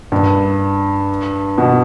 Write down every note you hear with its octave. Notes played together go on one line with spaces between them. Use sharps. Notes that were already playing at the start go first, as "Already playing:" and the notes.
G2
B2